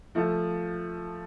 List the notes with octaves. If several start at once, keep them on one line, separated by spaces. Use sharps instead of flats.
F3 A3